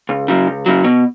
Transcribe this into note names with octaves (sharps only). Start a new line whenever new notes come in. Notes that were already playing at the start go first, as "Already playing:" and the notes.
C#2
C#3 F#3
C#2
C#3 F#3
B2